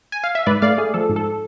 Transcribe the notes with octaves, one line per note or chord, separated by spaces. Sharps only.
G#5
F5
E5
G#2 B4 D5
A3 D5 F5
A3 G#4
F3 A4
G#2
A4